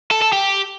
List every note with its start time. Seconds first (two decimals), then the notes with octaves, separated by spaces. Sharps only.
0.11 A4
0.22 A4
0.33 G4